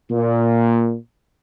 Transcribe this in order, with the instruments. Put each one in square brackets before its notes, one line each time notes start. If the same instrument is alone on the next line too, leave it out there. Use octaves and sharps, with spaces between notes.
[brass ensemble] A#2